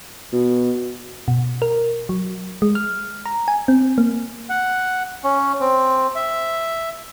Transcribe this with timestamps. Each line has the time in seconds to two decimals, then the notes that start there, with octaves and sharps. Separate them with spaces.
0.33 B2
1.28 B2
1.62 A#4
2.09 F#3
2.62 G#3
2.75 F6
3.26 A#5
3.48 G#5
3.68 C4
3.98 A#3
4.49 F#5
5.24 C#4
5.60 C4
6.15 E5